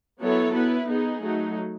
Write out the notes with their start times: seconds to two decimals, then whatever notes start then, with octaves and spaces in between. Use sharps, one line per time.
0.20 F#3 B3 E4 A4 C#5
0.54 B3 E4 B4
0.87 B3 D#4 G#4
1.22 F#3 A3 D#4